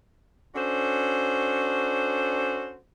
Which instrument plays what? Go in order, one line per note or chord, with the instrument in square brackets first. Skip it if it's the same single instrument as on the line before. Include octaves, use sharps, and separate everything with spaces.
[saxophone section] C#4 D4 F#4 A4 C5